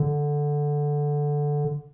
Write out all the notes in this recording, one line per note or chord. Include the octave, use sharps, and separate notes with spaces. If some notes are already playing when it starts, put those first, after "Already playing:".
Already playing: D3